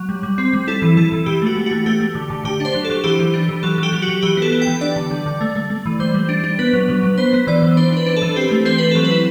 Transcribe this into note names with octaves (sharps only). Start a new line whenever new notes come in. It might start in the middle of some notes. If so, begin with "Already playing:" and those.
Already playing: F#3
G3
G3
C4
G3
E4 A4
E3
E3 A4
E3
E3 G4
A3 F#4
A3
F#4
A3
A3 G4
A3
D3
D3
D3 G4
D4 C5
F#3
A4
F#3
E3 G4
E3
D4
E3
F#3 A4
F#3
G4
F#3
F#4
F#3
E3 G4
B3 A4
B3
G5
E3
D4 D5
D3
G3
D3
A3
A3
A3
E3
G3 C5
G3
D4
D4
B3 B4
F#3
F#3
F#3
B3 C5
B3
E3 D5
E3
D4 C5
D4 B4
D4
A4
E3
C4 G4
A3
C4 C5
C4 B4
F#3 A4
B4
E4